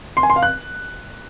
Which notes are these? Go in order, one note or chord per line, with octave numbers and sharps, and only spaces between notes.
C6
G#5
C6
F5
F#6